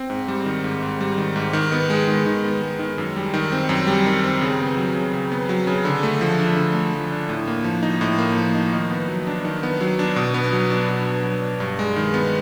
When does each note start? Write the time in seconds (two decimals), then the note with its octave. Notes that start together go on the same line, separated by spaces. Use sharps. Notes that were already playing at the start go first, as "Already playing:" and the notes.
Already playing: C4
0.10 G#2
0.28 G3
0.46 D#3
0.64 G#2
0.82 G#2
1.01 G3
1.18 D#3
1.36 G#2
1.53 D#3
1.72 B3
1.90 G#3
2.08 D#3
2.26 D#3
2.44 B3
2.62 G#3
2.79 D#3
2.98 F#2
3.16 G3
3.34 D#3
3.52 C4
3.69 F#2
3.87 G3
4.06 D#3
4.24 C4
4.41 C#3
4.60 B3
4.77 F#3
4.95 C#3
5.14 C#3
5.32 B3
5.49 F#3
5.67 C#3
5.85 D3
6.03 A3
6.21 F3
6.39 D4
6.57 D3
6.74 A3
6.94 F3
7.12 D4
7.29 A2
7.48 A#3
7.64 F3
7.83 D#4
8.01 A2
8.19 A#3
8.37 F3
8.55 D#4
8.73 D#3
8.91 B3
9.09 F#3
9.27 D4
9.45 D#3
9.63 B3
9.81 F#3
9.99 D4
10.16 B2
10.34 B3
10.53 F#3
10.70 D4
10.89 B2
11.06 B3
11.24 F#3
11.42 D4
11.60 G2
11.79 G#3
11.96 D#3
12.14 B3